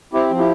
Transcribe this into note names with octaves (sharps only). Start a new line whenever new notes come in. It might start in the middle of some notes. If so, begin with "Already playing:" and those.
C4 E4 G4
F3
E4 G4